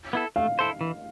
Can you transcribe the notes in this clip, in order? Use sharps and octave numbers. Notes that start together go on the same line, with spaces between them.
B3 E4 A4
A3 F5
E4 A4 C5
E3